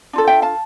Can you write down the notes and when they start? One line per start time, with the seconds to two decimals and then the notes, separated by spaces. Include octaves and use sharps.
0.13 D4 F4 A4
0.27 E5 G5
0.42 F5 A5